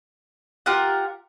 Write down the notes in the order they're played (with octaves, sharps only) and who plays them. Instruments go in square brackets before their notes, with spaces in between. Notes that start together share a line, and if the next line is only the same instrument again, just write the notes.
[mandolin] F4 G4 A#4 F#5